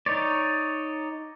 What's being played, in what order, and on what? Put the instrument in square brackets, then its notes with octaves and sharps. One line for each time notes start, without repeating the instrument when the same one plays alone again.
[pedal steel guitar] D#4 C#5 D5